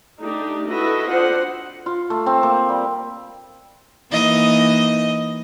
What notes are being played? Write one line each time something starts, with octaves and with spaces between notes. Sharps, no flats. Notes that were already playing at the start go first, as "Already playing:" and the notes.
A3 D4 D#4 G4
E4 F#4 A4 B4 D#5 E5
C4 D4 F4 C5 F#5
F4
A3
C4
A#3
G3
E3 A#3 D#4 D#5